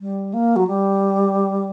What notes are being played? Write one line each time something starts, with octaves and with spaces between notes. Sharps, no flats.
G3
A#3
F#3
G3